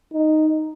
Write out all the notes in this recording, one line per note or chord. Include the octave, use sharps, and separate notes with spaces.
D#4